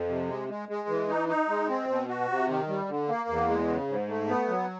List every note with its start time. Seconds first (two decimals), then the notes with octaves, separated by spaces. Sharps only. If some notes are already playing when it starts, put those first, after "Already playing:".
Already playing: F2
0.09 C3
0.29 G#3
0.49 G#3
0.69 G#3
0.88 E3
1.09 D#4
1.28 D#4
1.49 G#3
1.69 C4
1.88 B2
2.08 F#4
2.29 C3
2.48 D#3
2.68 G3
2.89 D3
3.08 A#3
3.29 E2
3.49 G#3
3.68 C#3
3.88 G#2
4.08 A3
4.29 B3
4.48 F#3